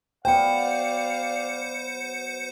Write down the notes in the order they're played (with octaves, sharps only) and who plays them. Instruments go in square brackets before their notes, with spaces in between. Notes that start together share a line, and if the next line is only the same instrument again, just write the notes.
[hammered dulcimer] F#3 B3 [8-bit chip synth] C5 C#7 [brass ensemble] D5 F5 [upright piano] G5